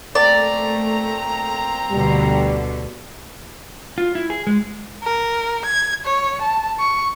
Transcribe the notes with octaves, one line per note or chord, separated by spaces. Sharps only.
A#2 A3 C4 D5 A#5
D2 B2 D3 G3
F4
E4
G#4
G#3
A#4
G#6
C#5
A5
C#6